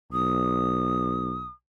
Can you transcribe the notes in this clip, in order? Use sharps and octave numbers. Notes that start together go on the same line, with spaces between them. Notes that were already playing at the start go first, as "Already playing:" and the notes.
B1 D#6